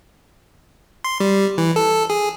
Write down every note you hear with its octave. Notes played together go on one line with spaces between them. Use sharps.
C6
G3
E3
A4
G#4